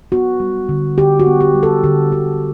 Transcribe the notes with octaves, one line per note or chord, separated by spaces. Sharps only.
B3 F#4
G3
D3
D3 G4
F#4
B3
G4
G3
A4
D3 G4
D3 F#4